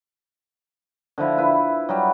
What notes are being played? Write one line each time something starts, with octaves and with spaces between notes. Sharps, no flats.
D3 F3 E4 E5
E4 B4
F#3 G3